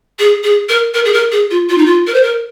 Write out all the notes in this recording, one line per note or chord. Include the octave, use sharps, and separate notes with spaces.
G#4
G#4
A#4
A#4
G#4
A#4
G#4
F4
F4
D#4
F4
A#4
C5
A#4